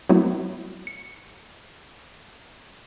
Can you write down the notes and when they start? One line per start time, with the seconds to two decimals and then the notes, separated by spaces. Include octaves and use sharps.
0.09 F#3 A3 B3 C4 E4 F#4
0.87 C#7